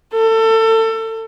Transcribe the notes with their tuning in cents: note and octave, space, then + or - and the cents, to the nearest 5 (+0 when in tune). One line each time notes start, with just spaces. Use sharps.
A4 +30